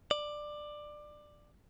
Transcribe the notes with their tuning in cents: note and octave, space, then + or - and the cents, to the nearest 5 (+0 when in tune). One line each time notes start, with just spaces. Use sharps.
D5 +15